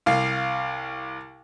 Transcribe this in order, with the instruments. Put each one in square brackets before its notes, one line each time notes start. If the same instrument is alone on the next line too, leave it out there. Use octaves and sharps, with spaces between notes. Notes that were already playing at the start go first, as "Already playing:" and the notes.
[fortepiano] C2 F5